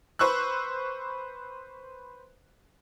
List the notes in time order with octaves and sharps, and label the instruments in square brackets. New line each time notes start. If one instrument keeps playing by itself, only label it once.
[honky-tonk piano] B4 C5 C#6 E6 F#6